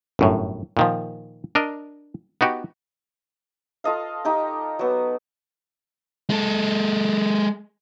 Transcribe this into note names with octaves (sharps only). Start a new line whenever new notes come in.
G1 F#2 A2
A#2 D#3 F3
D4 A#4 D#5
B3 D#4 F#4 G4
F4 A4 D#5 F5
D#4 G4 G5
F#3 B3
G#3 A4